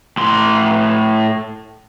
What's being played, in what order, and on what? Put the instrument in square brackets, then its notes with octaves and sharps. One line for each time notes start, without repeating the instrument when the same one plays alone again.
[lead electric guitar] A2 C6